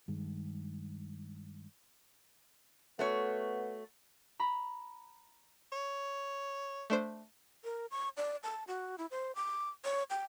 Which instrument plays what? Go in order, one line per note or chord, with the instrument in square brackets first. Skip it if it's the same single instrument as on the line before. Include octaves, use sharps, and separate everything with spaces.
[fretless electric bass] G2 D#3 G#3
[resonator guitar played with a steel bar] A3 F#4 C#5 [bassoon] B3
[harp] A#5 B5
[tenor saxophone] C#5
[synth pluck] A3 D4 C5
[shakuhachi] A#4
C#6
D5
A5
F#4
E4
C5
D6
C#5
G5